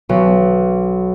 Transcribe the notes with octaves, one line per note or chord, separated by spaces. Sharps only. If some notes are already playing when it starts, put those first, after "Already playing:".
B1